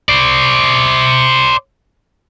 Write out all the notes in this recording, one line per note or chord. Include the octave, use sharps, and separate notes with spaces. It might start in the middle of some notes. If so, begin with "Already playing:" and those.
C5 D5